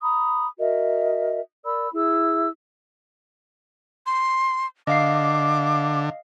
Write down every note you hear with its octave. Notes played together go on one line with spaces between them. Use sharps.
A#5 B5 D#6
F#4 A#4 D#5 E5
A#4 D5 B5 E6
E4 G#4 E6
C6
D3 D#5 F5 D6 C7